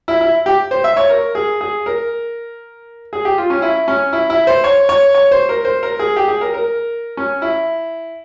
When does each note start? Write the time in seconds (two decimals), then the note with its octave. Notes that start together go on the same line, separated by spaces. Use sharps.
0.08 E4
0.21 E4
0.46 G4
0.71 C5
0.84 E5
0.97 C#5
1.09 A#4
1.35 G#4
1.61 G#4
1.86 A#4
3.13 G#4
3.25 G4
3.38 F4
3.50 C#4
3.62 E4
3.88 C#4
4.13 E4
4.30 E4
4.47 C5
4.64 C#5
4.89 C#5
5.15 C#5
5.31 C5
5.49 A#4
5.65 C5
5.83 A#4
5.99 G#4
6.16 G4
6.28 G#4
6.41 A#4
6.54 A#4
7.17 C#4
7.42 E4